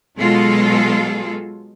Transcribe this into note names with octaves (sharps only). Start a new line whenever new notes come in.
B2 F#3 G#3 F4 G#4 A4